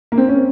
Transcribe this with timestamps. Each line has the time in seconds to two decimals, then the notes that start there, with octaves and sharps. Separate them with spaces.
0.12 A#3
0.18 C4
0.28 C#4